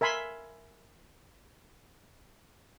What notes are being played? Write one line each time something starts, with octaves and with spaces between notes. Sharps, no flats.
A#4 E5 G#5 B5 C6